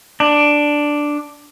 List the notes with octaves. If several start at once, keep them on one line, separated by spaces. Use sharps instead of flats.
D4